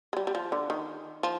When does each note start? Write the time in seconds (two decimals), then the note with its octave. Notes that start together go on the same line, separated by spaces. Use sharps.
0.13 G#3
0.17 G3
0.27 G3
0.35 F3
0.52 D3
0.70 D#3
1.23 F3